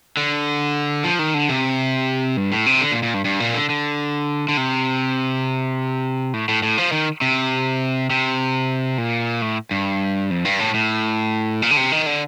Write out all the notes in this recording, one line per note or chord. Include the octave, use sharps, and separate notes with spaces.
D3
F3
D#3
D3
C3
G2
A2
C3
D3
A#2
A#2
G2
G2
A#2
D3
D3
D3
C3
A2
A2
A2
F3
D#3
C3
C3
A#2
A2
G2
F2
G2
A2
A2
A#2
D3
C3
D#3
D3